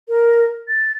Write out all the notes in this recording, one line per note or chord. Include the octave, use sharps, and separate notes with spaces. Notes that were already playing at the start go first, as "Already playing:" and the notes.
A#4
A6